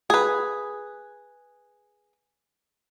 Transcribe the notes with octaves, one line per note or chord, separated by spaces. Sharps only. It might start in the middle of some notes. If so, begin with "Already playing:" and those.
G#4 B4